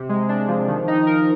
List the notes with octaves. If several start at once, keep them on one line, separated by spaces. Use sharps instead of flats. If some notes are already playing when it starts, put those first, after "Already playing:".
Already playing: C3
G#3
D4
F3
D#3
D#4
A#4